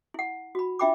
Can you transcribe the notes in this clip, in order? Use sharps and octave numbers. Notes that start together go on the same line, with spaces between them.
E4 F#5
F#4 B5
D4 F4 E5 G5 B5 D6